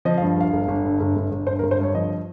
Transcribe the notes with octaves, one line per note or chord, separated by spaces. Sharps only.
F3 D#5
F5
G2
G1 F5
G1
G1
G2
G1
G1
G1
G2 C5
A#4
G1
C5
G2 C#5
F3 D#5